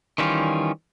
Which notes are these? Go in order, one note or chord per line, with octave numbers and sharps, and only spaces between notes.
D#3 E3 G3 C#4 F4